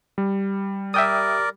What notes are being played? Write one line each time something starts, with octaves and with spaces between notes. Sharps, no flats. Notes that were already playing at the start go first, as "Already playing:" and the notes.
G3
A#4 D5 E5 G5 D#6